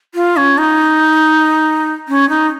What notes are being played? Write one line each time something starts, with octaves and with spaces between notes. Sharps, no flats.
F4
C#4
D#4
C#4
D#4